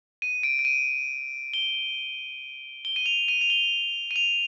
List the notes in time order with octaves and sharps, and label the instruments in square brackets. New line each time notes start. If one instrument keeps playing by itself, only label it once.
[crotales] D#7
D7
D7
D#7
G7
G7
D#7
F7
D#7
F7
G7
D#7
F7